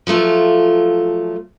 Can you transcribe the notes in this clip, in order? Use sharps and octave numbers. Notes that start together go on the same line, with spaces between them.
F3 F#3 A3 F4